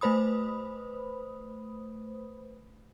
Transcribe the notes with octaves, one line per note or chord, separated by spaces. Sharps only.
A3 B4 C5 B5 D#6